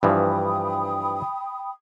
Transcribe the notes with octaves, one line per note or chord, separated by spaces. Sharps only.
G2 E3 F3 G5 B5 D#6